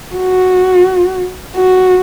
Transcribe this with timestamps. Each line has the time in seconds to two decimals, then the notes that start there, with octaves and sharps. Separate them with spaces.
0.15 F#4
1.56 F#4